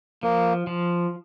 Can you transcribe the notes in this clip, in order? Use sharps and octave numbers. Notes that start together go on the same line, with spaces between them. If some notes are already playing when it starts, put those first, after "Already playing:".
F3 A#3
F3